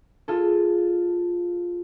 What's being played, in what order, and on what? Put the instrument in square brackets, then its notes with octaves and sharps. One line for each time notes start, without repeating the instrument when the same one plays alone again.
[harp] F4 G#4 A4